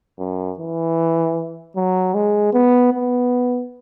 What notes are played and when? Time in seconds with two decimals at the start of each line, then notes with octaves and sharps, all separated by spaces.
0.19 F#2
0.59 E3
1.76 F#3
2.14 G#3
2.53 B3
2.93 B3